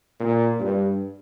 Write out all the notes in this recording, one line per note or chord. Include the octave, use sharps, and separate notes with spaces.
A#2
G2